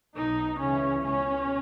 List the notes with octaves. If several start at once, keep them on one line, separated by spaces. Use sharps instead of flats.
B1 B2 D#4
C#2 C#3 E3 C#4
C#2 B2 C#4